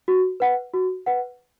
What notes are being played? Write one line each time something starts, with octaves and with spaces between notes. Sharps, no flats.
F#4
B4 F#5
F#4
B4 F#5